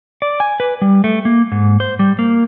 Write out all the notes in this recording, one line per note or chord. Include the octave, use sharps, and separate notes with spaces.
D5
G#5
B4
G3
A3
A#3
G#2
C5
G3
A#3